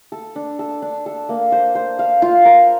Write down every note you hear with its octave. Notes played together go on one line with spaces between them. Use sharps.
A4
D4
A4
D4
A4
A#3
C5
C5
F5
F4
A#4